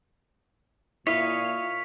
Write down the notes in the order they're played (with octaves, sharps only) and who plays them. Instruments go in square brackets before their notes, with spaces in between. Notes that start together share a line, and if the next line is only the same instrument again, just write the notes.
[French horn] A#2 [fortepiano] E4 [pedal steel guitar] C#5 D#5 F5 [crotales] B6